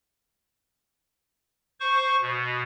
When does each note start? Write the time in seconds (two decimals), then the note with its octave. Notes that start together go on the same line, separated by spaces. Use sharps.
1.80 C5 C#6
2.22 B2